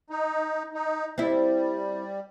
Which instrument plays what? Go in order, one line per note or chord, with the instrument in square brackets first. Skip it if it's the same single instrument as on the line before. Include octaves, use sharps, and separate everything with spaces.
[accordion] D#4
D#4
[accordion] G3 [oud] C4 E4